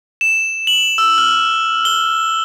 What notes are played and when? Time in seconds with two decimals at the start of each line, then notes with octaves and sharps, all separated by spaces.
0.21 E7
0.67 F#7
0.98 E6
1.18 F6
1.85 G7